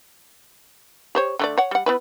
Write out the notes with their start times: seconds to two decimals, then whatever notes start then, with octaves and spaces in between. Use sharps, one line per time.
1.15 G4 C5 C#5
1.39 D3 A3 D5
1.58 C#5 F#5
1.71 G3 F#5
1.86 B3 E4 B4